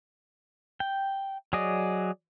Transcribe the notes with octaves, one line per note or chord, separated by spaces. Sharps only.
G5
F#3 G#4 D5 D#5